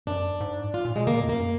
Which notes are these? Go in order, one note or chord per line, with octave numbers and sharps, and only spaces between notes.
F#2 D4
G#2
F4
A#2
B2 G#3
D3 A#3
A#2
F2
F#2 A#3